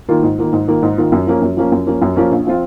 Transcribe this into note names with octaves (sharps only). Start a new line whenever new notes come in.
D#3 A#3 F4
G#2
D#3 A#3 F4
G#2
D#3 A#3 F4
G#2
D#3 A#3 F4
F#2
F3 A#3 C#4
F#2
F3 A#3 C#4
F#2
F3 A#3 C#4
F#2
F3 A#3 C#4
A#1
F3 C4 F4